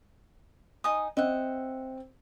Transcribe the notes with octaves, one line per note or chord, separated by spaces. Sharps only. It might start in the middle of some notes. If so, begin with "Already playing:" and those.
D#4 G#5 D#6
C4 D#5 E5 F#5